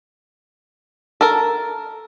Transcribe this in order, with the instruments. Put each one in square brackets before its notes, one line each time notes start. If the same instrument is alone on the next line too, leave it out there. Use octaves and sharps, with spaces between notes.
[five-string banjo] A4 A#4